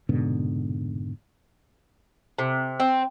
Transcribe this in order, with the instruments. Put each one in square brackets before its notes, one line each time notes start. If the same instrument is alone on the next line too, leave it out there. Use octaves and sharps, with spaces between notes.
[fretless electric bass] F1 G#2 B2 D3
[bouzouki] C3
C4